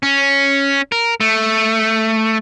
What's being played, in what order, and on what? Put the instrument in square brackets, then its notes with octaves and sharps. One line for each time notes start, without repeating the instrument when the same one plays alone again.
[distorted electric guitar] C#4
A#4
A3